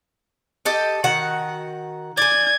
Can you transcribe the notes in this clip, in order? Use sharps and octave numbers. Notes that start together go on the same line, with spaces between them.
G4 A4 D#5
D#3 F#4 F#5
D5 G#5 G#6